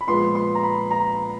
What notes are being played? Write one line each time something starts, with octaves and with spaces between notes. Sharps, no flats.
B5
A#2 F3 G#3 B3 C6
C6
A#5
B5
A#5